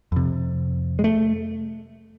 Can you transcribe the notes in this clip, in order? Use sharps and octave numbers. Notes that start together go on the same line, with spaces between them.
F2 C3
G#3
A3